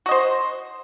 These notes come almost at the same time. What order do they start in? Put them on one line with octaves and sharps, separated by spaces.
F#4 D#5 C5